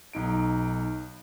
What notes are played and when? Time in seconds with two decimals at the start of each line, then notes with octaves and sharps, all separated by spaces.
0.13 B1 D#4 D7